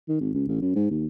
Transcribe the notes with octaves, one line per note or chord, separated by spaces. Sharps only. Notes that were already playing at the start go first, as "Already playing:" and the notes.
D#3
G#1
C#2
A1
F#2
G#2
D#2